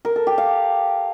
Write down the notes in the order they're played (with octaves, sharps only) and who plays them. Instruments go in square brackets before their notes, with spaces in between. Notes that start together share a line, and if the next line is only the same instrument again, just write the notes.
[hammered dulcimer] A#4
A4
G4
F5